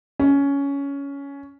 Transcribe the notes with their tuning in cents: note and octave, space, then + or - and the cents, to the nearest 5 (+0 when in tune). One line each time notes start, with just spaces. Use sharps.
C#4 +15